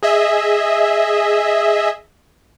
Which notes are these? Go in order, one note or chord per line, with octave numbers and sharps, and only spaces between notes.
G#4 D#5 E5